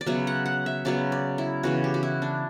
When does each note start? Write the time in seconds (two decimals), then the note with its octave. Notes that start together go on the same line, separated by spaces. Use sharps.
0.01 D5
0.06 C#3 F#3 B3 E5
0.27 F#5
0.46 F#5
0.66 E5
0.85 C#3 F#3 B3 D5
1.12 D5
1.38 E4
1.63 C#3 E3 B3 F#4
1.84 G4
1.94 F#4
2.03 E4
2.22 D4